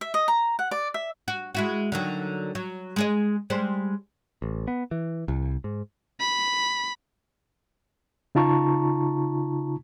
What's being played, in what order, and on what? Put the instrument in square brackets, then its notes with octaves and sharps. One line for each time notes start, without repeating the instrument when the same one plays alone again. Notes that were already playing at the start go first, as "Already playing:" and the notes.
[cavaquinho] E5
D#5
A#5
F#5
D5
E5
[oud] F#4
G#3 E4 F#4
D3 D#3 F#3
F#3
G#3 G#4 D#5
G3 G#3 C5
[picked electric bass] A1
B3
E3
C2
G#2
[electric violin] B5
[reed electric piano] C#3 D#4 F4 A5 A#5 C#6